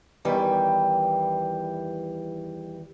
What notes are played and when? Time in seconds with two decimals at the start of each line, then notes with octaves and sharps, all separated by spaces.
0.25 E2 D#3 E3 G3 B4 G5